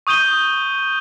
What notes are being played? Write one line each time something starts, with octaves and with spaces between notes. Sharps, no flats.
C#6 D#6 G6 D#7 G7